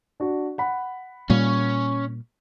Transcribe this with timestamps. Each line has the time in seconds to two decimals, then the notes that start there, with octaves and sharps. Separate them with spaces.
0.20 D4 F#4
0.58 F#5 B5
1.30 A#2 G3 A#3 C#4